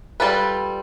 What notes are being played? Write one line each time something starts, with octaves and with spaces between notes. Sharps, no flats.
G3 F4 A4 B4